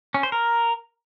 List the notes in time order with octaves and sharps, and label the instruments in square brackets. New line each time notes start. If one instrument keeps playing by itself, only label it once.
[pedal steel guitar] C#4
C5
A#4